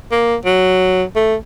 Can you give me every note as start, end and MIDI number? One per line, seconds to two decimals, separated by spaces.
0.11 0.35 58
0.45 1.03 54
1.16 1.35 57